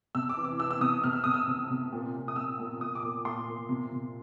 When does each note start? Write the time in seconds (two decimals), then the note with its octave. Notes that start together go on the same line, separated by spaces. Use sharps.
0.15 C3 E6
0.29 D6
0.37 E3
0.44 D6
0.59 E3 E6
0.71 E6
0.81 C3 D#6
1.04 C3 F6
1.13 E6
1.24 C3 D#6
1.34 E6
1.47 C3
1.70 C3
1.92 A#2
2.14 A#2
2.28 D#6
2.36 A#2 E6
2.59 A#2
2.81 A#2 D#6
2.95 D6
3.03 A#2
3.25 A#2 C6
3.48 A#2
3.69 C3
3.92 C3